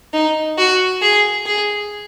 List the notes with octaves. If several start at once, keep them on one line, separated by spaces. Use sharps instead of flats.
D#4
F#4
G#4
G#4